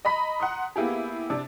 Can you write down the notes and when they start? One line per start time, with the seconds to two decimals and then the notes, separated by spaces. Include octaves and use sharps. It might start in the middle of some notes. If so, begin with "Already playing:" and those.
0.05 D#5 A#5 B5 B6
0.40 F#5 A#5 C6 D#6
0.76 A#3 B3 E4 G4 G#4
1.30 C3 D4